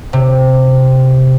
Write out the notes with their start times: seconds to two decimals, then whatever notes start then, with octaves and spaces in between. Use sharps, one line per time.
0.13 C3